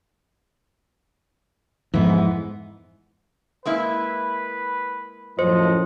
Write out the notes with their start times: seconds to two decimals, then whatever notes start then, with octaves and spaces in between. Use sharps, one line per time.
1.94 F2 G#2 E3 G#3 B3
3.66 G#3 A#3 E4 B4
5.39 F#2 A2 F3 C5 D#5